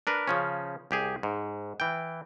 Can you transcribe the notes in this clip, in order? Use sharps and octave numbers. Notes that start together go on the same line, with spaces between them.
D4 A#4 B4
C#3 F3 C#4
C2 G4 G#4
G#2
E3 G5